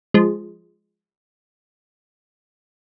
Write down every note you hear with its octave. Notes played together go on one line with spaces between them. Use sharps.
F3 G#3